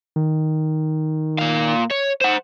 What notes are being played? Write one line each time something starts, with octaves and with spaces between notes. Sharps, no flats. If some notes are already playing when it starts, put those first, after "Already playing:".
D#3
A#2 F5
C#5
C5 F#5